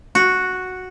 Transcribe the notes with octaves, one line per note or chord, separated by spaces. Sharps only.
F#4